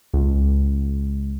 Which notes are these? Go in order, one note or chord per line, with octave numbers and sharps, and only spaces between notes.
C#2